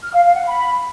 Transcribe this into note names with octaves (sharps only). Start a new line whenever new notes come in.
F6
F5
F5
F#5
B5